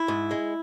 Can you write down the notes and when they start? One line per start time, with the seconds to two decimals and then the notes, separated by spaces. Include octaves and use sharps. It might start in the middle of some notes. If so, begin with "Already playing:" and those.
Already playing: E4
0.08 G#2
0.31 G#3